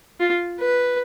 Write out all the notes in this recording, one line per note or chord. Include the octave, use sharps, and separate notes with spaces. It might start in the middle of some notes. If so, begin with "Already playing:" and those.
F4
B4